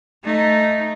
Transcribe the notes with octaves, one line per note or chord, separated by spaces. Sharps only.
A3 D#4